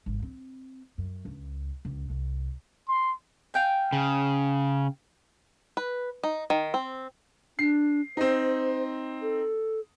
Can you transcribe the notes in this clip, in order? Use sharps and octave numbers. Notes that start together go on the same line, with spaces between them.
G#1
C4
F#2
C#2
C#2
C2
C6
F5 G5 G#5
C#3
B4
D#4
D#3
C4
D4 C7
C4 D#4 C5
A4